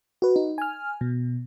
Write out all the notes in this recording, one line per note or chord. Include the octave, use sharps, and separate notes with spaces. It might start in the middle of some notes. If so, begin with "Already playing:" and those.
F#4 B4
D#4
G#5 F6
B2